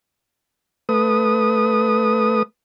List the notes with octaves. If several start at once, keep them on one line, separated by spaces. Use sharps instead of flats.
A3 B4 D#6